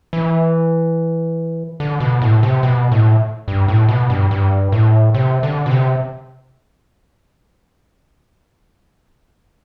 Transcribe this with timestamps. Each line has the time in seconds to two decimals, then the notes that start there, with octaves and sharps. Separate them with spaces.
0.13 E3
1.80 D3
2.00 B2
2.22 A2
2.43 C3
2.63 B2
2.92 A2
3.48 G2
3.68 A2
3.89 B2
4.10 G2
4.31 G2
4.72 A2
5.15 C3
5.43 D3
5.66 B2
5.71 C3